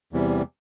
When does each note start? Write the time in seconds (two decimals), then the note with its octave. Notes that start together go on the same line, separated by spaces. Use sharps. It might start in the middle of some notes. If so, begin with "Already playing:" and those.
0.13 E2 C3 E3 G3